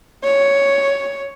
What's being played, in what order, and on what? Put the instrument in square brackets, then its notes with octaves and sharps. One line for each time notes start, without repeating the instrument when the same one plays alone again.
[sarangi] C#5